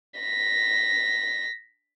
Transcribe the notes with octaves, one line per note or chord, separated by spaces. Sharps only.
A#6 B6